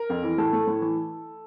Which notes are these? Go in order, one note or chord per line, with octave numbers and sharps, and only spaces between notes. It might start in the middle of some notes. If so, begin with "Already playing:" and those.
Already playing: A#4
F2
E3
A2 A4
A3
A2
E3